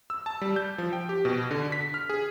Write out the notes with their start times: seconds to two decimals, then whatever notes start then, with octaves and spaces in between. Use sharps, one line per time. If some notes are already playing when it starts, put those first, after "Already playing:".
0.10 E6
0.26 A5
0.41 G3
0.56 G6
0.78 F3
0.93 G5
1.09 G4
1.25 B2
1.51 D3
1.72 B6
1.94 F6
2.09 G#4